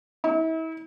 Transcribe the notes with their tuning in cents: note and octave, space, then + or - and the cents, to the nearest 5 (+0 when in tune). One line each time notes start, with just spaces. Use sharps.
E4 -40